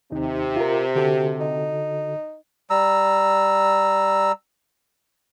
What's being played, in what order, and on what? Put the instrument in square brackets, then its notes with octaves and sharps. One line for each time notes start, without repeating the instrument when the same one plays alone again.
[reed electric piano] D#2 D#4 [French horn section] C3
[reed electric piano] F4 A#4
[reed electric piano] D3 F#4 A4 [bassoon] G4
[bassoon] D#4
[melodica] G3 A#5 E6